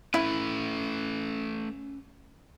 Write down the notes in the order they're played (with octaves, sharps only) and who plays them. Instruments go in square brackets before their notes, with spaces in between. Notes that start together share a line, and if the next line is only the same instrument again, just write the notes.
[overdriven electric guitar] A3 B4 [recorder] C#4 [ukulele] E4